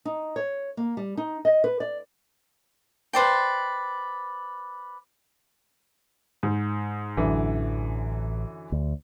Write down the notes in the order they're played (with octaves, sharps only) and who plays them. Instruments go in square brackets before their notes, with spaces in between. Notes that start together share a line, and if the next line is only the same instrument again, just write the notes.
[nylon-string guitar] D#4
C#5
A#3
G3
D#4
D#5
B4
D5
[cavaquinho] B4 C5 D5 G5
[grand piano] G#2
[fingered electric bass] A1 [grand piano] F#2 D3 E3
[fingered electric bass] D2